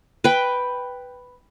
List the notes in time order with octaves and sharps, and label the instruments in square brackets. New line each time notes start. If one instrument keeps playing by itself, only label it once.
[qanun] B4 G5